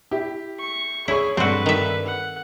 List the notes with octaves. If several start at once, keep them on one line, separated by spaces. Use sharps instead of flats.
E4 G4
C#6
E4 G#4 C#5 C#6
G2 C4 F#4 A4 B4
D#3 E5
F#5